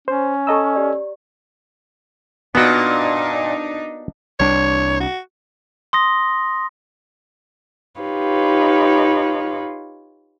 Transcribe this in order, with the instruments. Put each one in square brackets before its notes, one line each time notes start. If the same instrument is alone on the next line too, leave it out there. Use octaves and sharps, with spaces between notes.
[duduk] C#4 [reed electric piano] C5
[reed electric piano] A4 D#5 E6 [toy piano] A#5 C#6
[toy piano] G4 C#5 D5
[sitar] A#2 [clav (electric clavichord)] B3 F#4 [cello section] D4 D#4
[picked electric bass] C2 G3 D4 [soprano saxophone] C#5
[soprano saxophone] F#4
[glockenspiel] C6 D#6 A#6
[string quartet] D#4 F4 G4 B4 C#5